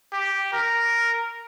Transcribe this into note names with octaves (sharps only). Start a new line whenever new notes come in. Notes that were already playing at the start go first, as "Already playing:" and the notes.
G4
A#4